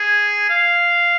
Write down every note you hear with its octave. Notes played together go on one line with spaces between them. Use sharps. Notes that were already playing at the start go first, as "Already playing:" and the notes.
Already playing: G#4
F5